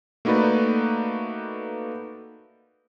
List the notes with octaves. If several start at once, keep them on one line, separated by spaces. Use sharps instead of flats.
A3 A#3 D#4 F#4 B4 D5